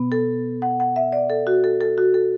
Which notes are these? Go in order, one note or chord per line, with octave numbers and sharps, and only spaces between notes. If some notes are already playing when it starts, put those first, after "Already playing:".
Already playing: B2 B3
A4
F#5
F#5
E5
D5
A4
F#4
A4
A4
F#4
A4